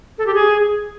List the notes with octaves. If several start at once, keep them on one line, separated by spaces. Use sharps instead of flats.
A4
G4
G#4